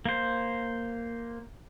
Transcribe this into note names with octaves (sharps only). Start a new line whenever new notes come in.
A#3 C5